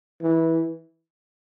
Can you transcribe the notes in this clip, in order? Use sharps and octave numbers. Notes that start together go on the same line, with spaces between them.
E3